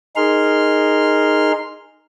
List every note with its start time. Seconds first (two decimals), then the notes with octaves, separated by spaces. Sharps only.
0.16 D#4 G#4 A#4 C6 F6